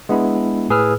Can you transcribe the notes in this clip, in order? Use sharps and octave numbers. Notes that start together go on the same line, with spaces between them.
G#3 B3 D4 E4
A2 G#4 B4 E6 F6